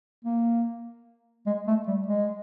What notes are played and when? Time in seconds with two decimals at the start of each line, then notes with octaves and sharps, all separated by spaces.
0.25 A#3
1.46 G#3
1.67 A3
1.87 G3
2.08 G#3